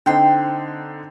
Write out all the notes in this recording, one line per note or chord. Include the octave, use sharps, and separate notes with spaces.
D3 C4 D#4 G5 C6